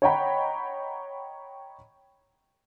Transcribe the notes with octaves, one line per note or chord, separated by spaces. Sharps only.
C#5 D#5 F#5 G5 A#5 B5